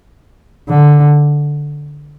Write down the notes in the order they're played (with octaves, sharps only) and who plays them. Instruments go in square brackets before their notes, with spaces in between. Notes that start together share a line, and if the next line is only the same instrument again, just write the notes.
[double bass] D3